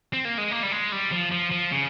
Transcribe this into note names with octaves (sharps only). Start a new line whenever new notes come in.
C4
A#3
G#3
A#3
G3
G#3
G3
F3
F3
F3
C#3